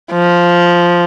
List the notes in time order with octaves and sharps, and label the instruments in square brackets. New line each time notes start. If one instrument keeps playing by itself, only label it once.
[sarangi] F3